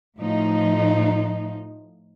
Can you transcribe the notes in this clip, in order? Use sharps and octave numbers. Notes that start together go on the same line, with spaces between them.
A2 F3 D#4